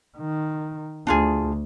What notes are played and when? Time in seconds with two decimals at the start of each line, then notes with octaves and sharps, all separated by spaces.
0.18 D#3
1.07 D2 D4 F4 G#4